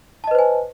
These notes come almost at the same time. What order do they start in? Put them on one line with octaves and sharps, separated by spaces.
A5 D#5 B4 C5 G#5